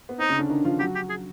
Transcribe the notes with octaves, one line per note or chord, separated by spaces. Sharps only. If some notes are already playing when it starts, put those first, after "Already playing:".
B3
C4 D#4
C#3 C#4
D3 D4
D#3 D#4
F3 F4
F#3 F#4 G4
G4
G#4